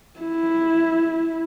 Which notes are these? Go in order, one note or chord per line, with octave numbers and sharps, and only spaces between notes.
E4